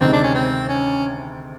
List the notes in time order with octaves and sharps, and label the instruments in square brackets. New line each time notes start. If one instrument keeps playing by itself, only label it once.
[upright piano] D2 C3 D#3 G#3 [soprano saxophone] C4
[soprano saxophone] D4
C#4
C4
C#4